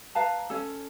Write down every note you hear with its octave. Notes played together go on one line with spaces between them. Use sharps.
B4 F5 A5 A#5
C#4 A4